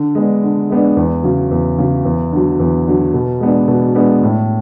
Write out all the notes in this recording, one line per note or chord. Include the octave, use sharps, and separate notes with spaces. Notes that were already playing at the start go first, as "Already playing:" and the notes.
Already playing: D3
G#3 B3 D4
D3
G#3 B3 D4
E2
C#3 F#3
E2
C#3 F#3
E2
D3 F#3
E2
D3 F#3
B2
G#3 B3 D4
B2
G#3 B3 D4
A2